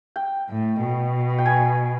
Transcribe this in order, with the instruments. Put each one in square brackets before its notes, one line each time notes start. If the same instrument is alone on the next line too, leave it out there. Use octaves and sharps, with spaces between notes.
[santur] G5
[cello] A2
B2
[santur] G5
G#5